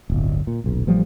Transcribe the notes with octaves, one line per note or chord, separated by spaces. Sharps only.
D1 G1
A#2
D#1 B1
A1 F3 G3